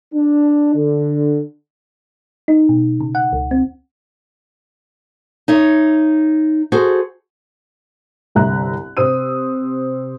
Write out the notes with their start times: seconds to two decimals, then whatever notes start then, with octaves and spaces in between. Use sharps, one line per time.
0.14 D4
0.75 D3
2.48 D#4
2.69 B2
3.01 C#3
3.15 F#5
3.33 C#2
3.51 C4
5.48 D#4 C#5 E5
6.72 F#4 G#4 A4 C5
8.35 G1 C2 E5 A#5 F#6
8.97 C3 C4 D#6 E6 D#7